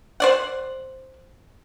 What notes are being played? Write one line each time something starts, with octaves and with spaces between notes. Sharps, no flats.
C5 D5 F#5